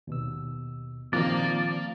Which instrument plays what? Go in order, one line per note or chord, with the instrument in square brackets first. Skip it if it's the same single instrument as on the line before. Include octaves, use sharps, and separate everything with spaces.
[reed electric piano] D#2 B2 E6
[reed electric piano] A#2 D#3 C4 [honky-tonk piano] F3 [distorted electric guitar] A#3 A#5 [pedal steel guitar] D5